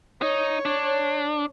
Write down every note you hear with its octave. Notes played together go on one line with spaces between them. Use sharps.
D#4 C#5
D4